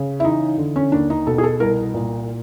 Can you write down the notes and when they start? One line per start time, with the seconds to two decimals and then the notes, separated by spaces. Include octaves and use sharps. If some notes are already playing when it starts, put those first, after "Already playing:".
Already playing: C#3
0.20 E4
0.25 E3 D#4
0.58 D3
0.76 C#4
0.92 D#2 D4
1.10 D#4
1.27 B2 A4
1.38 G#4
1.43 A4
1.60 C2 A#4
1.94 A#2